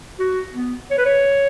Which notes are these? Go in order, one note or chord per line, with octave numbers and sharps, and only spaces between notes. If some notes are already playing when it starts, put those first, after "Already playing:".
F#4
B3
C#5
B4
C#5